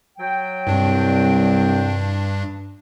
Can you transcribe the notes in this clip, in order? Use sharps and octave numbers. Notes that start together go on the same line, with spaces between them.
F#3 G5
C2 G2 D4